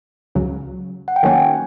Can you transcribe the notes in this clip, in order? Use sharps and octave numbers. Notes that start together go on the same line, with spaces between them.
C#2 C#3 F#3
F#5
G5
D#3 F#3 A#3 C#4 F#4 G#5